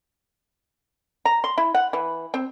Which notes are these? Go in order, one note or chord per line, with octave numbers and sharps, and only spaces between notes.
A#5
C6
E4
F#5
E3
C4